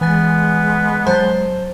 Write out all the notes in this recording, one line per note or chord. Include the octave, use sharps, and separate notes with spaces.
E3 G#3 B3 G#5 A6
F#3 C5 A5 A6